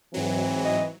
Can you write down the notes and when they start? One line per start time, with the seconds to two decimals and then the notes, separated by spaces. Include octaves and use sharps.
0.14 G#2 E3 F#3 C4
0.65 D#5